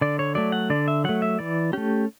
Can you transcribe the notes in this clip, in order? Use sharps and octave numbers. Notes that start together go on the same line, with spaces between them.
D3 D5
C#5
F#3 A3 D5
F#5
D3 D5
E5
F#3 A3 F#5
E5
E3 D5
A3 C#4 G4